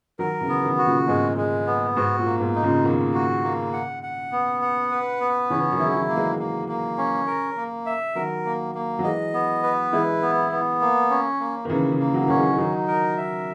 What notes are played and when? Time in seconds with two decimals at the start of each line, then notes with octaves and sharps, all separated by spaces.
0.19 D#3 F#3 A#4
0.41 C#3 E3
0.49 B3
0.63 B2 D#3
0.78 F#4
0.85 A#2 C#3
1.07 G#2 B2 G#3
1.37 G#3
1.67 B3
1.96 G#2 F#4
2.18 A#2
2.25 A#3
2.40 G#2 B2
2.55 D#4
2.62 A#2 C#3
2.85 B2 D#3 A#3
3.14 F#4
3.43 A#3
3.73 F#5
4.03 F#5
4.32 B3
4.62 F#5
4.91 B4
5.20 B3
5.50 C#3 E3 C#4
5.61 E3
5.72 D#3 F#3
5.79 E4
5.85 G#3
5.94 D#3 F#3
6.09 A#3
6.16 E3 G#3
6.39 A#3
6.69 A#3
6.98 C#4
7.27 A#4
7.57 A#3
7.86 E5
8.15 D#3 F#3 A#4
8.45 A#3
8.75 A#3
8.99 F#3
9.04 E3 G#3 D#5
9.34 B3
9.63 B4
9.92 E3 G#3 E4
10.22 B3
10.52 B3
10.81 A#3
11.10 C#4
11.40 A#3
11.65 D#3
11.69 C#3 E3 A#3
11.92 C#3 E3
11.99 A#3
12.14 F#3
12.21 E3
12.28 D#3 F#3 C#4
12.36 E3 G#3
12.52 G#3
12.58 D#3 F#3 D#4
12.88 A#4
13.17 E5